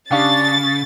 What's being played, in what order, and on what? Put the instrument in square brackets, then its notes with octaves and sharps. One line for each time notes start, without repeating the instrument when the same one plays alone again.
[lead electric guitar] C#3 [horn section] D4 [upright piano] G4 F5 C#6 [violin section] A6